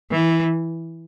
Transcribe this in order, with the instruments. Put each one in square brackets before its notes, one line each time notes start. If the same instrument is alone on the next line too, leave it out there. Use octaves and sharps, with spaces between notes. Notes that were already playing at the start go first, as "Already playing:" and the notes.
[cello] E3